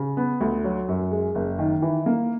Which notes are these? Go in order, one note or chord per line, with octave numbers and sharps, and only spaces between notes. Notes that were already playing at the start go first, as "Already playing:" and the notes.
Already playing: C#3
B3
D2
F#3
F#2
G#3
F#1
D#3
E3
A#3